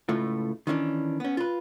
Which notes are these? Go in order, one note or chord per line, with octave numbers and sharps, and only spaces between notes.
C#2 A2 A3 F4
D#3 E3 C#4 D4
B3 C#4
F4 B4